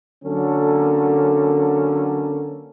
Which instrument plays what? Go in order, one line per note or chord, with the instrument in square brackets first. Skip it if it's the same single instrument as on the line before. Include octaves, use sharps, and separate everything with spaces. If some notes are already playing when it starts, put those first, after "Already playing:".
[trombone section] D3 F#3 A#3 C#4 A4